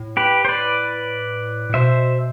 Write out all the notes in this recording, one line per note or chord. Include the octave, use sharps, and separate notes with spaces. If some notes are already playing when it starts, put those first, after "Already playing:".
Already playing: A2
G4 B4
C5
B4 D5
A2
B2 C5 E5